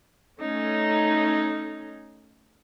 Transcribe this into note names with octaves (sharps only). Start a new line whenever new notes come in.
A3 C#4 D#4